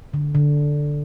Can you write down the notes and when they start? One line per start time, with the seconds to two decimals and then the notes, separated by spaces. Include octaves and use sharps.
0.14 D3
0.35 D3